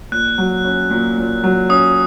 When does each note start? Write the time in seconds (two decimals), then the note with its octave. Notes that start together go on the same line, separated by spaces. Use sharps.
0.12 A#2 F#6
0.38 F#3
0.65 C#4
0.90 A#2
1.18 A#2
1.44 F#3
1.69 C#4 D#6